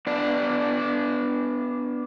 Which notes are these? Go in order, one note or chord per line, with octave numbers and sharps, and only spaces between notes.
B3 D4 D5 A5